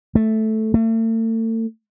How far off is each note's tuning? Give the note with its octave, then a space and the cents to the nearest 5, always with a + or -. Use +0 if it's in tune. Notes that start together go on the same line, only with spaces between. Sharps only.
A3 -5
A3 +40